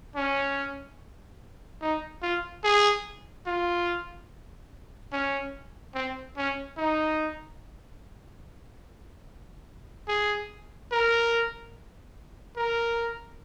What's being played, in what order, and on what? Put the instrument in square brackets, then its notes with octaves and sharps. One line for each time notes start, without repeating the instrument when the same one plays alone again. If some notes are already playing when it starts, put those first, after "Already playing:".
[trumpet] C#4
D#4
F4
G#4
F4
C#4
C4
C#4
D#4
G#4
A#4
A#4